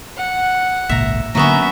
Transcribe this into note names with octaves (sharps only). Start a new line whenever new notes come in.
F#5
G#1 C#2 A#2 E5 A#5
D3 F#3 A#3 B3 C#4 E5 A#5